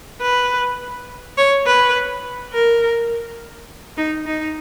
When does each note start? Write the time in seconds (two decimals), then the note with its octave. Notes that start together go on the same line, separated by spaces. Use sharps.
0.22 B4
1.38 C#5
1.66 B4
2.53 A#4
3.97 D#4
4.26 D#4